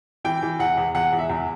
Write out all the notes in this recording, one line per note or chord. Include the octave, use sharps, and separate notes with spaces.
E3 G5
E3
E2 F#5
E2
E2 F#5
E2
E5
E2